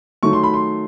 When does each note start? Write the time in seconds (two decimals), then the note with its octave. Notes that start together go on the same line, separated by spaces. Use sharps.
0.23 D#3 F#3 A3 C#6
0.33 C6
0.43 B5
0.54 C6